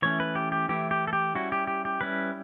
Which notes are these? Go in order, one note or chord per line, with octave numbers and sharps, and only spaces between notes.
E3 A3 C#4 E4 C#5
B4
G4
G4
E3 A3 E4 G4
G4
A4
G4
G3 C#4 E4 F#4
G4
G4
G4
G3 C#4 E4 B4